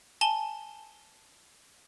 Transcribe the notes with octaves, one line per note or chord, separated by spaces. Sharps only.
G#5 A5 G7